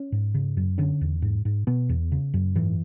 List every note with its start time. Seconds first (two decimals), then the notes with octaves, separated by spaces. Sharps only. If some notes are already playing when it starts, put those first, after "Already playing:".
Already playing: C#4
0.12 G#2
0.34 C#3
0.57 F#2
0.78 D3 C#4
1.01 E2
1.22 G#2
1.45 G#2
1.67 B2 B3
1.89 E2
2.12 C#3
2.34 F#2
2.55 G#2 E3